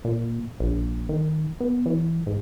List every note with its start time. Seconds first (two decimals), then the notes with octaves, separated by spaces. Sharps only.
0.05 A#2
0.60 A#1
1.09 D#3
1.60 B3
1.86 E3
2.26 G#2